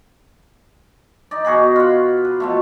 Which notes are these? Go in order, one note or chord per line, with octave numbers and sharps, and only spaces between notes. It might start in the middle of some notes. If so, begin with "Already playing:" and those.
D#4 D5
B2 F#4 G#4 B5
F4 F#5
B4
B2 F3 A3